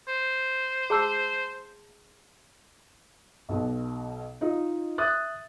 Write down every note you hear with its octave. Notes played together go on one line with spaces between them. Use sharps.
C5
G#4 A5 E6
B1 B2
D#4 F4 D#5
E5 D#6 F#6 A6